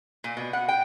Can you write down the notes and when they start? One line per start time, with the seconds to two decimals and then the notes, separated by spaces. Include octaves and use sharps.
0.24 A#2
0.37 B2
0.53 F#5
0.68 G5